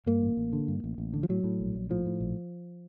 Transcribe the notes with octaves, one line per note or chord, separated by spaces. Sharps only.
G2 A#3
A1
A1
D3
G2
A1
A1
D3
F3
A2 F#3
A2
A#1
A#1
A2 F3
A2
A#1